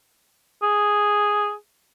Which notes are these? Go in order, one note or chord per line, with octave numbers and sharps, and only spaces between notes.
G#4